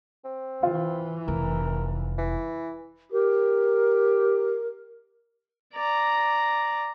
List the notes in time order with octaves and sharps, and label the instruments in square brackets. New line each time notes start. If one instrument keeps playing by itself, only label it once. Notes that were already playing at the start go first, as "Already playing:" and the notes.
[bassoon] C4
[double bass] E3 [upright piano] F4
[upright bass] F1 [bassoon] A#4
[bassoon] E3
[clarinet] G4 [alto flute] A#4
[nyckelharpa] D5 A#5